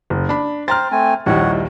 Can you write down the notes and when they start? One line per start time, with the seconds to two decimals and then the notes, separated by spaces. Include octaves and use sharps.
0.10 F#1
0.29 D4 B5
0.68 C5 G5 A#5 F6 A6
0.92 A3 C4 G#5
1.26 A#1 D#2 G3 D#4 E4 C#5 F#5